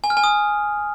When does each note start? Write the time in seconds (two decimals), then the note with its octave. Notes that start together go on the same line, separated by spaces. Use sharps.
0.04 G#5
0.10 F6
0.17 G#5
0.24 D#6